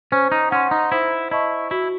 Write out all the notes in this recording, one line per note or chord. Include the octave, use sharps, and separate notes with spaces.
C#4 C5
D#4
C#4 F#5 C6
D#4
E4 C5
E4 D#5 A5 C#6
E4 F#4